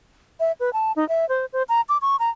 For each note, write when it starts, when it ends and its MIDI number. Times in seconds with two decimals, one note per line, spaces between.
0.40 0.52 76
0.60 0.72 71
0.73 0.92 81
0.96 1.07 63
1.09 1.28 76
1.29 1.45 72
1.53 1.63 72
1.69 1.81 82
1.89 1.97 86
2.02 2.16 85
2.19 2.30 82